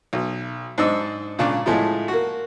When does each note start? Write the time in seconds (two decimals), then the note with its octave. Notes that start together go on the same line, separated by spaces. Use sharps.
0.13 B1
0.78 G#2 D4 D#5 E6
1.39 A#2 C#3 D4 C#6
1.66 A2 F3 G#3 A3
2.08 A#3 F#4